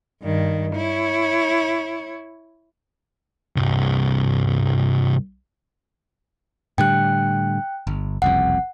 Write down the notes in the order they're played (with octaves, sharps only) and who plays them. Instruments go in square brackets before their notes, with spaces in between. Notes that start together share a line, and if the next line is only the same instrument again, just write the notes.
[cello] G2 D#3
E4 C#5
[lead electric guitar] C2 G2
[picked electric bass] A2 D3 G3 [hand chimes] G5 F#6
[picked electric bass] G1
[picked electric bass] F#1 C2 F2 [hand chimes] F#5